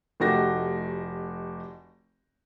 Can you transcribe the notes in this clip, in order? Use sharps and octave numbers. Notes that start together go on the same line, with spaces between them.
F1 A3 D#4 F#4 G4 A#6